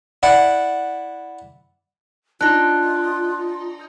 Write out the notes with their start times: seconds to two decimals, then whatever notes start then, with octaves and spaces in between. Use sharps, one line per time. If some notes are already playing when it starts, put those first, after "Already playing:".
0.23 E4 D5 F#5
2.41 D4 D#4 F4 F#6